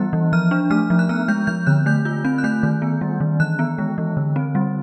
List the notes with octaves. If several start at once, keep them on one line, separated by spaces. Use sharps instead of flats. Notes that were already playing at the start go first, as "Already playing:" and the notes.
Already playing: E3 G3 B3 F#6
E3
F3 F6
D4
A3 F6
F3
F#6
B3 F6
G#3 G6
F3 G6
D3 F#6
A3 G6
F4 G6
C4 G6
F#6
A3 G6
D#3
B3
G3
D#3
E3 F#6
B3
G#3
E3
D3
C4
G3